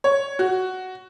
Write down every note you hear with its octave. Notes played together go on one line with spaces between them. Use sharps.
C#5
F#4